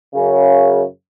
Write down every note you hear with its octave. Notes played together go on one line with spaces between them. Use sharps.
F#2 C#3